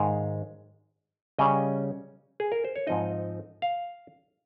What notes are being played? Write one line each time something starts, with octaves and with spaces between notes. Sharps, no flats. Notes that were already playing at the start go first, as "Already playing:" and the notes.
Already playing: G#2 D#3 G#3 F5
C#3 G3 C#4 D#5
G#4
A#4
C5
C#5
G#2 F3 C4 D#4 D#5
F5